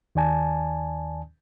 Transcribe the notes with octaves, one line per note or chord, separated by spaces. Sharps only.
D#2 D#3 D5 G#5 A5